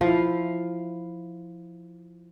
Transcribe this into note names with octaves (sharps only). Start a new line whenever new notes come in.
F3 E4 F5